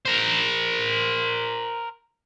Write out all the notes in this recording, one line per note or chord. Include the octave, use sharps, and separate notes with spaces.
A#4 C5